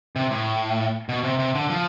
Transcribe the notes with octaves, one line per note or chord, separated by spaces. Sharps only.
C3
A2
B2
C3
C3
D3
F3